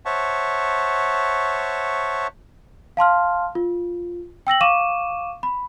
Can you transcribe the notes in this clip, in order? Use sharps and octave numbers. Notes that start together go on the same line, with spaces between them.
C5 C#5 E5 F#5 A5 C#6
F5 A5 C6 F6
F4
G5 E6 A#6 F#7
F5 C#6 D6 D#7 E7
B5